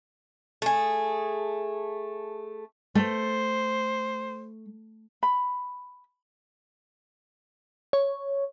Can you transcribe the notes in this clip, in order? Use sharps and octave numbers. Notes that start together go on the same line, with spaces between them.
A3 G#4
A3 C5
B5
C#5